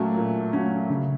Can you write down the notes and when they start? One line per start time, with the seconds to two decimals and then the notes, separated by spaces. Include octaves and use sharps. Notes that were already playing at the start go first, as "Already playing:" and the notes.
Already playing: A#2 F#3 A3 C#4
0.17 A#2
0.53 F#3 A3 C#4
0.89 C#3